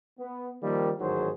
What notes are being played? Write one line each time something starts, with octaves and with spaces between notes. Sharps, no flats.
B3
D#3 F3 G3 A#3
A1 G#2 D#3 F#3 G#4 C5